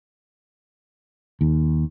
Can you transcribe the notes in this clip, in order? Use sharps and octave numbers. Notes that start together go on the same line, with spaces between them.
D#2